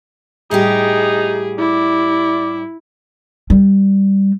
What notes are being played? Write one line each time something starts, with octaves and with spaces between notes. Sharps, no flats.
A2 G3 D#4 G4 G#4
E4 D5
G3